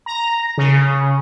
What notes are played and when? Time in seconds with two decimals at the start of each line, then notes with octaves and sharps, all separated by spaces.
0.06 A#5
0.58 C#3